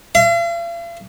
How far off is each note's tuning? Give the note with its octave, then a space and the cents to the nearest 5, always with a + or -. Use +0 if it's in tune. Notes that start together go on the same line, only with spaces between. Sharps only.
F5 -45